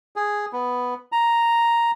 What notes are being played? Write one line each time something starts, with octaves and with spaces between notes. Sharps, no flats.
G#4
B3
A#5